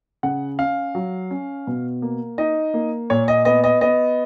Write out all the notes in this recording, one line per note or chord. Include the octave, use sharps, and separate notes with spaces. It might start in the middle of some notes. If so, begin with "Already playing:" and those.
C#3 F#5
C#4 F5
F#3
C#4
B2
A#3
D#4 D#5
A#3
A#2 C#5
D#5
B3 D#5
D#5
B3 D#5